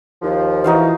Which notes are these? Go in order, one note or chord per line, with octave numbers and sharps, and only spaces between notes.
D#2 F3
E3 D#4 F#4 F5